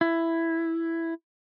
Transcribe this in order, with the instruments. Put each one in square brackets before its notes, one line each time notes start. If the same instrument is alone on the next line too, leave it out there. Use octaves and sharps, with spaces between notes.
[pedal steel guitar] E4